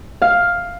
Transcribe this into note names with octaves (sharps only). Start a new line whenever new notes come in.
F5